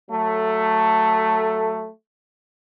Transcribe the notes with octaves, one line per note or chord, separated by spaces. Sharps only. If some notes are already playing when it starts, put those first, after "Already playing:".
F#3 A3